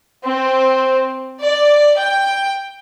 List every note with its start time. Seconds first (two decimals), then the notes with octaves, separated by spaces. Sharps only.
0.25 C4
1.42 D5
1.98 G5